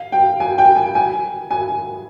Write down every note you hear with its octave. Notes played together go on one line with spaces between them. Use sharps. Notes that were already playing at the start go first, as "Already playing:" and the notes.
Already playing: F5
G5
G#5
G5
G#5
G#5
G#5